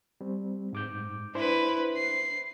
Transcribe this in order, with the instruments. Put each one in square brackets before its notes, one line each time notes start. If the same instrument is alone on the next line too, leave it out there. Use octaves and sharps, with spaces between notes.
[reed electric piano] G3 C4
G#2 D6 G6
[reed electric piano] D4 C5 [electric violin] E4 B4
[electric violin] C7